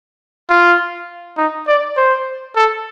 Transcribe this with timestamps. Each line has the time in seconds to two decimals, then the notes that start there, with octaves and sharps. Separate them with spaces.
0.49 F4
1.38 D#4
1.68 D5
1.97 C5
2.56 A4